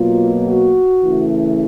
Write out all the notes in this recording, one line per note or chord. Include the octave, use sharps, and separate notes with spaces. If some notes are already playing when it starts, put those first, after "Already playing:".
Already playing: B2 F#3 A#3 F4
F#4
C#3 E3 A3